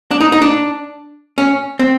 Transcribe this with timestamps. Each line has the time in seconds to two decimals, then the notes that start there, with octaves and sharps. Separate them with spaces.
0.11 D4
0.21 D#4
0.32 D#4
0.42 D4
1.38 C#4
1.79 C4